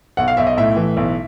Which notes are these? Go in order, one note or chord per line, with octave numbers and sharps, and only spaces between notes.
B1 F#5
F5
B1 E5
D#5
A2 E5
E3
B1